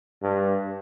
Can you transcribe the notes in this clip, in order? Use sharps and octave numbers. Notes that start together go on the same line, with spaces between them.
G2